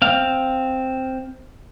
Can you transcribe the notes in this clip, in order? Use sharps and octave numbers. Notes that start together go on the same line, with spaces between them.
C4 F5